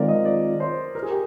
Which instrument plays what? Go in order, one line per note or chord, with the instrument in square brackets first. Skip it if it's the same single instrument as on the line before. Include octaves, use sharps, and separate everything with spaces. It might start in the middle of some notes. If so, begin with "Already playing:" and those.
Already playing: [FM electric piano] D#3 G#3 C4 F4 [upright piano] A#4 D5
[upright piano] D#5
D5
C5
A#4
G#4
G4